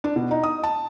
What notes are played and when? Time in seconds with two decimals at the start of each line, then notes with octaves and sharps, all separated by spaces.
0.04 D4
0.16 B2
0.31 D#4
0.43 D#6
0.63 A5